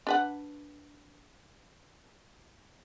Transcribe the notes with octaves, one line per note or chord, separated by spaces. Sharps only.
D4 B4 F#5